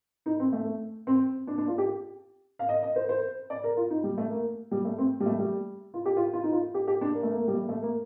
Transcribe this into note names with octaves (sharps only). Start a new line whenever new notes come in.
D#4
C4
A3
C4
D4
D4
F4
G4
F5
D#5
D#5
C5
C5
D5
A#4
F4
D#4
G3
A3
A#3
G3
A3
C4
G3
A3
G3
F4
G4
F4
F4
D#4
F4
G4
G4
D4
A#3
A3
A#3
G3
A3
A3
A#3